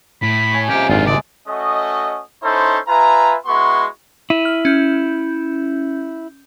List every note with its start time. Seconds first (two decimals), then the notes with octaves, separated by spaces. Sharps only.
0.22 A2 B5
0.52 C#5 G#5
0.69 C3 A#3 C#4 F4 G4
0.90 G#1 F#2 D4 F4
1.07 C#2 G#3 D5 A5
1.48 A3 C#4 F#4 D#5
2.43 C#4 D#4 E4 A4 C5
2.88 F4 B4 E5 G#5 A#5
3.46 G#3 B3 E4 F#4 C6 C#6
4.30 E4 D#7
4.45 F6
4.65 C#4 G6